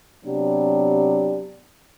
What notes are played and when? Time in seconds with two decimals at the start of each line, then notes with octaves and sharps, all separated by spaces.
0.24 C3 F#3 B3 D4 G4